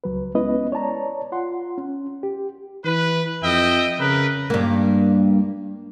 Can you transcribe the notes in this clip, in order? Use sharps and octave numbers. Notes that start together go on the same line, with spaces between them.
C#2 F#3 B4
G#3 B3 C#4 E4 B4 D#5
C#5 D5 A5 A#5
F4 F#5 C6
C#4
G4
E3 B4
F2 D#5 E5 G5
C#3 A#4 B4
G2 A#3